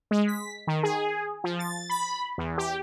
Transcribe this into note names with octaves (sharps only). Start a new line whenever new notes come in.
G#3
B6
D#3
G#4
F3
A6
B5
E2
G4